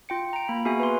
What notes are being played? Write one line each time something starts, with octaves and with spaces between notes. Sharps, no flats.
F4 G5 C#7
A#5 D7
A#3 B5
B3 F#4 G#4 E5 G#5
B4 C6